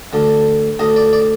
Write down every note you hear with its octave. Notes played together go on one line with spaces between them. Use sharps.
D2 D3
D2 D3 D#5
D5
D5